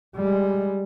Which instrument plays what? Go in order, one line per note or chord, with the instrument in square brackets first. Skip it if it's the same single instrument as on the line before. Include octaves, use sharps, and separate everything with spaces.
[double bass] G3 G#3